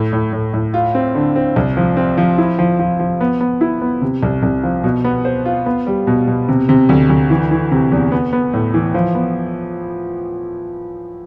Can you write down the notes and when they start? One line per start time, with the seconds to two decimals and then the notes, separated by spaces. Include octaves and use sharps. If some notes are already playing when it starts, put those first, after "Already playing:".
Already playing: A2
0.12 A2
0.33 A2
0.53 A2
0.74 F4
0.94 C4
1.15 D3
1.36 C4
1.56 C2
1.77 F3
1.97 C4
2.17 F3
2.38 E4
2.59 F3
2.79 F3
2.99 F3
3.21 B3
3.40 B3
3.61 E4
3.81 B3
4.02 C3
4.23 C2
4.43 C2
4.63 F3
4.84 B2
5.04 B3
5.25 C5
5.45 F4
5.66 B3
5.87 G3
6.07 B2
6.27 B2
6.48 C3
6.69 C3
6.89 D2
7.09 D2
7.30 E3
7.51 E3
7.71 C3
7.92 E2
8.12 B3
8.33 B3
8.53 A2
8.74 E3
8.94 F3
9.15 B3